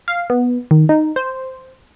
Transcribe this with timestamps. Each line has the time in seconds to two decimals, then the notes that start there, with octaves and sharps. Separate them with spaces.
0.08 F5
0.30 B3
0.71 D#3
0.89 D#4
1.16 C5